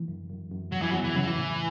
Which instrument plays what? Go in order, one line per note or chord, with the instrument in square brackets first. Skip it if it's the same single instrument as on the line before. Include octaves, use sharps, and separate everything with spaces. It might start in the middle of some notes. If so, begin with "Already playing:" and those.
Already playing: [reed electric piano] E3
F#2
F#2
F#2
[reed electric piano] E2 [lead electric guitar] F#3
[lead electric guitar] E3
[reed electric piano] E2 [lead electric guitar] F#3
[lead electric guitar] E3
[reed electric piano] C#3 [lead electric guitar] F#3
[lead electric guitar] E3
[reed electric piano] A2